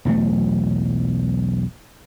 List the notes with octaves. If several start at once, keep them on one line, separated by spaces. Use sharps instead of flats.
B1 E2 F#3 A3